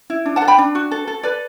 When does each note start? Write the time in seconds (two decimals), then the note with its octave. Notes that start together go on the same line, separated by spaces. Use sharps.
0.10 E4
0.26 D4
0.36 F#5 A5
0.42 A4
0.48 G5 B5
0.58 D4
0.75 F#4
0.91 A4
1.08 A4
1.23 A4 B4 D5